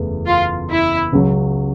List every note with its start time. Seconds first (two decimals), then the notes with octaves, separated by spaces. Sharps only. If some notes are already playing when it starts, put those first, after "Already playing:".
Already playing: F#1 E2 C#3 E3 A3
0.27 F4
0.70 E4
1.13 C#2 C#3 F#3